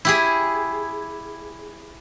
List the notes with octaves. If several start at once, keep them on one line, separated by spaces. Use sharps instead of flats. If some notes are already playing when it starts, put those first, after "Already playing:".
E4 G4 G#4